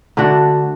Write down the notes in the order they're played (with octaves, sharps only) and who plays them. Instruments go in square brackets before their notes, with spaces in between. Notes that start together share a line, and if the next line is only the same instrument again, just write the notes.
[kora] D3 A3 D4 F#4